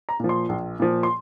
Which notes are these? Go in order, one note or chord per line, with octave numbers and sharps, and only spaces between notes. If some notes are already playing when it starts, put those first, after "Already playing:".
A#5
A#2 F3
C6
A#1
A#2 F3
C6